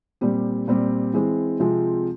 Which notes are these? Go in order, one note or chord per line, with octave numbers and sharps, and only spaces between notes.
A#2 G3 C4 G4
A#2 G3 C4 G4
E3 G#3 C4
C3 F3 G#3 C4 F4